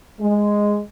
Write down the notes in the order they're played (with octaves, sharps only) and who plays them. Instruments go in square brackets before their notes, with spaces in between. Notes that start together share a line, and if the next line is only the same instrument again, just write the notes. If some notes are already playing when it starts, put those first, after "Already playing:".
[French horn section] G#3